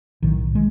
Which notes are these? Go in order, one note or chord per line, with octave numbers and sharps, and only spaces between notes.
B1 A2 D#3
G#3